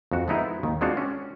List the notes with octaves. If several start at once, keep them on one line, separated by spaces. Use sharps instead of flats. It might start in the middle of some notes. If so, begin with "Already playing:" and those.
F2 F#4
F3 G#3 B3 D#4 E4
D#2 D#3
G#3 C4 D4 F4 F#4
C#4